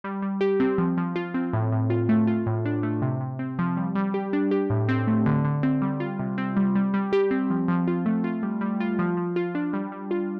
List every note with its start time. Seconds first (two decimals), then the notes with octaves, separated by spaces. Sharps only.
0.04 G3
0.22 G3
0.41 G4
0.60 C4
0.78 F3
0.97 F3
1.16 F4
1.34 C4
1.53 A2
1.72 A2
1.90 F4
2.09 A3
2.27 F4
2.46 A2
2.65 D4
2.83 A3
3.02 C3
3.21 C3
3.39 C4
3.59 F3
3.77 G3
3.95 G3
4.14 G4
4.33 D4
4.51 G4
4.70 A2
4.89 C4
5.07 A3
5.26 D3
5.45 D3
5.63 C4
5.82 G3
6.00 F4
6.19 C3
6.38 C4
6.56 G3
6.75 G3
6.94 G3
7.13 G4
7.31 C4
7.50 F3
7.68 F3
7.88 F4
8.06 A3
8.24 F4
8.43 G3
8.61 G3
8.80 F4
8.99 F3
9.17 F3
9.36 F4
9.55 D4
9.73 G3
9.92 G3
10.11 F4